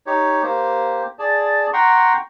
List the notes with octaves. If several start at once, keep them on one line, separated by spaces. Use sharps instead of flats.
D#4 G4 C#5
A#3 G4 C5
G#4 D5 A5
F#5 G5 A#5 C6 C#6